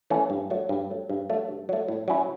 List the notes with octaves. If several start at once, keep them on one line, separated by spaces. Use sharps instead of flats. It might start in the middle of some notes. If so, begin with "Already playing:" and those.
E3 A3 C#4
G2
F#3 A3
G2
F#3 A3
G2
F#3 A3
G2
F#3 A3
A2
F#3 C#4 E4